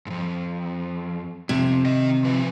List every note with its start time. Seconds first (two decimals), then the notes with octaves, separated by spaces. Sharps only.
0.06 F2 G#2
1.49 F2 C3
1.85 D#3 D#5
2.24 F3 B4